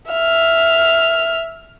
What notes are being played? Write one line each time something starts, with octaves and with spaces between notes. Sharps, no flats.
E5 F6